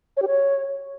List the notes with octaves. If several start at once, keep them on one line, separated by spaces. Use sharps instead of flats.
C#5
G4
C#5